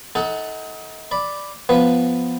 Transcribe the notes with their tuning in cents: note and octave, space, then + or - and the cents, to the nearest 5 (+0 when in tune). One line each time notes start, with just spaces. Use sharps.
D#4 +30 A4 +0 F#5 +10
D5 +0 B5 +0
F3 +0 B3 +0 B4 +0